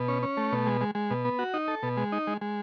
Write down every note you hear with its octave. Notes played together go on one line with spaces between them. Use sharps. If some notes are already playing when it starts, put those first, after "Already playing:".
Already playing: B2
C#4
C#4
A3
B2
G#3
G#3
G#3
B2
B3
F#4
D#4
A4
B2
G#3
D#4
G#3
G#3